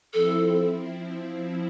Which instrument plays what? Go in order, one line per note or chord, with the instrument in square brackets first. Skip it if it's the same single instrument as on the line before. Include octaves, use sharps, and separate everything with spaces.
[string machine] F3 C4 E4 [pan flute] A4